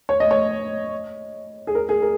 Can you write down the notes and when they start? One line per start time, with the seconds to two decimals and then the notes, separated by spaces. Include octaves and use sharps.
0.09 C#5
0.20 D#5
0.31 C#5
1.67 G#4
1.75 A#4
1.89 G#4
2.02 A#4